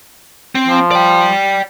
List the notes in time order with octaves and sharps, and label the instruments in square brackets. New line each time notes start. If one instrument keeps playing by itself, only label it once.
[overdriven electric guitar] C4
[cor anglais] F3
[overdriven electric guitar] D5 G5